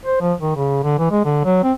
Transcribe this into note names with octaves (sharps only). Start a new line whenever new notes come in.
C5
F3
D#3
C#3
D3
E3
G#3
D3
F#3
C4